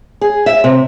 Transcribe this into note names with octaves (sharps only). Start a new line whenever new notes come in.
G#4
E5
C3